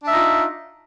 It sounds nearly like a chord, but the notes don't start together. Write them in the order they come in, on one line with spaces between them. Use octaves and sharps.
D4 E5 D#4 F4